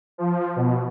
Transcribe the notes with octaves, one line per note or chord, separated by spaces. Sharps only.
F3
B2